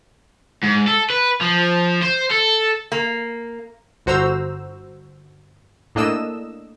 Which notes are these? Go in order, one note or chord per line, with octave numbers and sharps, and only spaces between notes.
G#2
A4
B4
F3
C5
A4
A#3
G1 F#4 C5 A#5 E6 E7
A2 A#3 D4 D#5 E6 E7